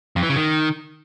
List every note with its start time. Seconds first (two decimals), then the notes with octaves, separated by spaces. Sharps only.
0.16 F2
0.23 E3
0.29 C#3
0.36 D#3